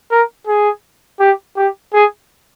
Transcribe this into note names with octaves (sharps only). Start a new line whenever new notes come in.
A#4
G#4
G4
G4
G#4